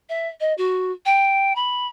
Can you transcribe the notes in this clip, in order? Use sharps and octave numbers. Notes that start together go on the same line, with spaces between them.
E5
D#5
F#4
G5
B5